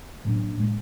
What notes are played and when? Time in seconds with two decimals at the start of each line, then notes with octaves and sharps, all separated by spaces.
0.25 A2 F#3 A#3 D4
0.57 A2 G#3